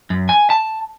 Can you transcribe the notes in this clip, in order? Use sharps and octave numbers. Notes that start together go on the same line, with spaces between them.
F#2
G#5
A5